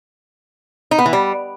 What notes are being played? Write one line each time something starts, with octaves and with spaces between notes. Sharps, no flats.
D#4
B3
E3
G3